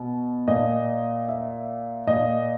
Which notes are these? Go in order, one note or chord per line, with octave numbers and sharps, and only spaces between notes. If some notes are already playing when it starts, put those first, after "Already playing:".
Already playing: B2
A#2 D#5
E5
A#2 D#5